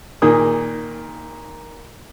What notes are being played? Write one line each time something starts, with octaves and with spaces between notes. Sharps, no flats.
A#2 D#3 A#3 G#4 D#6